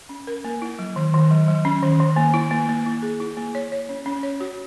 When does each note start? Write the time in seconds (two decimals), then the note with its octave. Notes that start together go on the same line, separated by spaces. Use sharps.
0.09 C#4
0.27 A#4
0.45 A#3
0.62 E4
0.79 F#3
0.96 D#3
1.14 D#3
1.31 F#3
1.48 F#3
1.65 C#4
1.83 D#3
2.00 D#3
2.16 A#3
2.34 E4
2.51 A#3
2.69 A#3
2.86 E4
3.02 G#4
3.20 E4
3.37 A#3
3.55 C#5
3.72 C#5
3.89 C#4
4.06 C#4
4.23 C#5
4.40 F#4